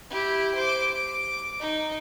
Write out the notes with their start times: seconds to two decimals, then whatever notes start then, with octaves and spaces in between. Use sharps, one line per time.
0.10 E4 G4
0.55 C5 D6
0.93 D6
1.59 D#4